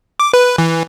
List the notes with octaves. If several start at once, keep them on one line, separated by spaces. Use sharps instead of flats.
D6
B4
E3